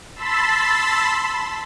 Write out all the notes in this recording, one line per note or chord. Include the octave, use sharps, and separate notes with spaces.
A5 B5 C6 E6 A6 B6